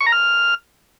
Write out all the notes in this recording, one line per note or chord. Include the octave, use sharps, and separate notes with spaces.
C#6
A#5
F6